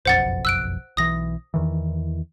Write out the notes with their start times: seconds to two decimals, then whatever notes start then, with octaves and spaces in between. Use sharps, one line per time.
0.05 F#1 B1 F2 C5 F#5 A6
0.45 E6 F#6 D7
0.97 B1 E3 D#6 A#6
1.54 E2 D#3 E3